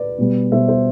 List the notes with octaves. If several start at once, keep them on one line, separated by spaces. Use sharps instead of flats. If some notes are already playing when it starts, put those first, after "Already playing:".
Already playing: B4 D5
B2 G3 B3
B2 G3 B3 C5 E5
C5 E5